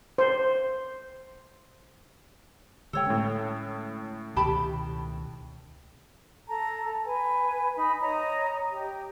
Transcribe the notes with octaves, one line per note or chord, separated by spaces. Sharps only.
C5
D3 G#3 A4 C#5 G5
A2 C#4
C#2 B2 D#3 G4 A5 B5
A4 A5 A#5
B4 G#5
D#4 B5
C#5 D#5 A#5
G4